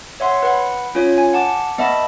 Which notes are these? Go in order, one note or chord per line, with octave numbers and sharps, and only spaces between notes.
C#5 E5 F#5 C6
B4 F#5 B5
C#4 F4 C#5
G#5
F#5 A5 D6
B3 D#5 E5 A5 B5